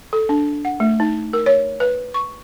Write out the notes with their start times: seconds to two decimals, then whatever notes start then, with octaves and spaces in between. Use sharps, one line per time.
0.13 A4
0.29 D4
0.65 F#5
0.80 A3
1.00 D#4
1.33 A#4
1.46 C#5
1.80 B4
2.14 C#6